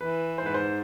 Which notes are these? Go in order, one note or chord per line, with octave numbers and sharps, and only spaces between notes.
E3 B4
G#2 C5
B4
C5